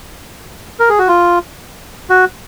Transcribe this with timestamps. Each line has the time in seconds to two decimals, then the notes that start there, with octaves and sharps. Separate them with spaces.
0.80 A#4
0.89 G#4
0.99 F#4
1.08 F4
2.10 F#4